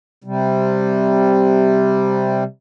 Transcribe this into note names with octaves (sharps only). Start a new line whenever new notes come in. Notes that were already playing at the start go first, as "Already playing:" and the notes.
C3 G3